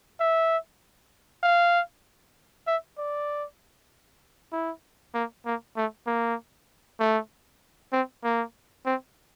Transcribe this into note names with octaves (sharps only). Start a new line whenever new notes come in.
E5
F5
E5
D5
E4
A#3
A#3
A3
A#3
A3
C4
A#3
C4